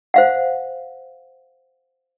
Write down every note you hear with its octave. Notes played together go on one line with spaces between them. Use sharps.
C5 F5 F#5